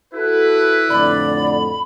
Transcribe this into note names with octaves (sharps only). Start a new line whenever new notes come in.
E4 F#4 A4 B4
F2 A2 D3 D5 B5